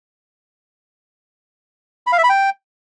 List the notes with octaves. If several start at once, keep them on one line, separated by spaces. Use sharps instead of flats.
B5
F5
E5
B5
G5